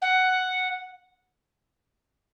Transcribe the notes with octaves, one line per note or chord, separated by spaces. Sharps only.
F#5